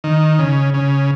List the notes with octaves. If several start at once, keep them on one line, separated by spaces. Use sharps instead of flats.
D#3
C#3
C#3